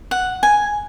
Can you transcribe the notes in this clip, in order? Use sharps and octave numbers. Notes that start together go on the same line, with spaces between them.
F#5
G#5